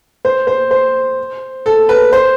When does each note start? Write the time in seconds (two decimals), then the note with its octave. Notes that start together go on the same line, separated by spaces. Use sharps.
0.25 C5
0.47 C5
0.71 C5
1.66 A4
1.89 B4
2.13 C5